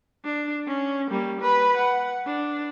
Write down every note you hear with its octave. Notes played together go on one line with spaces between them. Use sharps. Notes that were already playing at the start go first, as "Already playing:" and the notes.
D4
C#4
G3 A#3
B4 B5
F#5
D4